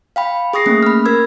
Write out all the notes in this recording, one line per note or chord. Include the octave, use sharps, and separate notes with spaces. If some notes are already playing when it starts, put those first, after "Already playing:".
F5 G5 B5
G#4 C#6 D#6 A#6 C7
A3 A#3 C#4
B5 F6
A#4 E6 G#6